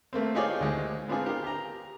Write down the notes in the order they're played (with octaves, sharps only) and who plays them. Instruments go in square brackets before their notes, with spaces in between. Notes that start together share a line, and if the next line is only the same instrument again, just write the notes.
[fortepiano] A3 A#3 C4
D#4 F4 G4 G#4 C#5 D5
D2 G#3
B3 C4 D4 F4 G#4
G4 A#4
G4 A#5